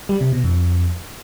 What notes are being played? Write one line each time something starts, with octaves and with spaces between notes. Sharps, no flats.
G3
C3
B2
F2